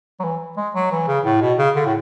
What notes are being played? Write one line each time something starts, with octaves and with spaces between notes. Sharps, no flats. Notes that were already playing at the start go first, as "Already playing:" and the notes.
F#3
E3
G#3
F#3
E3
C#3
A2
B2
C#3
D3
A2